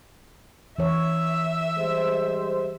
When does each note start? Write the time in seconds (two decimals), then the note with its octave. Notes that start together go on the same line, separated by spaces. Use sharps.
0.78 E3 C#5 E5
1.77 G3 G#3 C5